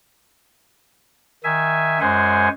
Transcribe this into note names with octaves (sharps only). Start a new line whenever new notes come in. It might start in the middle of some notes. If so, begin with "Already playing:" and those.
D#3 E5 G#5
F#2 G#3 C5 F#5 G#5